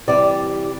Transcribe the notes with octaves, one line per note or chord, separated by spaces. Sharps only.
C3 E3 G3 D5